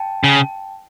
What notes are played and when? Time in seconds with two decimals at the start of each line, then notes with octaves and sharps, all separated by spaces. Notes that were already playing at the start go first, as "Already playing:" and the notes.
Already playing: G5 A5
0.24 C#3